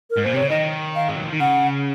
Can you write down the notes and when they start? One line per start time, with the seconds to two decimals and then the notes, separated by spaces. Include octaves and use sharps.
0.10 A#4
0.17 G#2
0.24 A#2 C5
0.34 C3 C#5
0.42 C#3
0.49 D#3 D#5
0.95 F5
1.09 G#3
1.16 F#3
1.24 F3
1.33 D#3
1.40 C#3 F#5